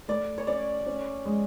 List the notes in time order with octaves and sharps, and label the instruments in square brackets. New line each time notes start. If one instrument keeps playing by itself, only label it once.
[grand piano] A3 [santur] D5
[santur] C#5
[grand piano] C#4 [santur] D5
[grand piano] C#4
G#3